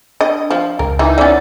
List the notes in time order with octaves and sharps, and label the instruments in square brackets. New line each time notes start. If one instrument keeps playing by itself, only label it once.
[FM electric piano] D4 [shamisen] D#5
[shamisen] F3
[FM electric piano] C#2 [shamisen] A#4
[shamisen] E3 [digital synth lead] D#4
[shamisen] E3 C#4 [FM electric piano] D5 F#5 A6